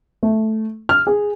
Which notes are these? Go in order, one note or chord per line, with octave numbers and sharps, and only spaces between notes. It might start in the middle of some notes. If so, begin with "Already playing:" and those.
A3
F6
G#4